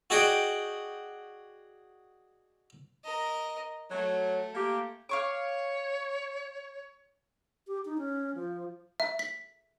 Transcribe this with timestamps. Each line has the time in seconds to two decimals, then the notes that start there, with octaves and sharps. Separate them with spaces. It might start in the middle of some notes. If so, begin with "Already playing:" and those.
0.10 F#4 G#4 D5 D#5 F#5 G5
3.04 A#4 D#5
3.91 F#3 A3
4.54 A#3 F4 G4
5.09 C#5 F5 C#6 D6
7.67 G4
7.85 D#4
7.98 C#4
8.35 F3
9.00 E5
9.19 B6